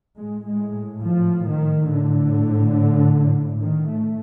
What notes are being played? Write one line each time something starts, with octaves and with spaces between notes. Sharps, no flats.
A2 G#3
G#3
F3
D#3
A2 D3
A2 D#3
A3